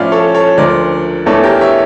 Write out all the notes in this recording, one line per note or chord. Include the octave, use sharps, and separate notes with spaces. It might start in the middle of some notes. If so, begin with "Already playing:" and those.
Already playing: A2 F3 A3 C#4 D5 F5
A4 C#5
A4 C#5
D2 D3 F3 A#4 D5
E2 E3 A3 D4 A4 C#5
G4 A#4
C#5 E5